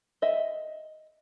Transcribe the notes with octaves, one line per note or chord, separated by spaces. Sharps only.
D#5 E5